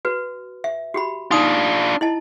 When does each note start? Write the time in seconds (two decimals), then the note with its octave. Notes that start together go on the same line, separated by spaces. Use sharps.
0.05 F#4 B4
0.64 E5
0.94 F#4 G4 B5
1.31 D4 D#4 F4 D#6
2.01 E4 D#5 A5